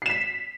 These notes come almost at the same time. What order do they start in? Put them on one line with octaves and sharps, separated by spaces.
C7 E7 B6